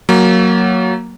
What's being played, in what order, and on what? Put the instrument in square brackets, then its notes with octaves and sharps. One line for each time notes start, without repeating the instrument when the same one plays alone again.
[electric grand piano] F#3 A#3